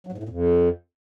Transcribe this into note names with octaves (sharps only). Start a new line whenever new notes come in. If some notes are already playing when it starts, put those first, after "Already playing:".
F#3
G#2
A2
A#2
F2